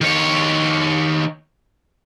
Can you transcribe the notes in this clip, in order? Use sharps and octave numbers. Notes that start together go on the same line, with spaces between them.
D#3 C#5